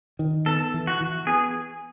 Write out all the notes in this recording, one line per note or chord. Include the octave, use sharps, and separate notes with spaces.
D#3
B3 A4
E3
F#4
E3
B3 G#4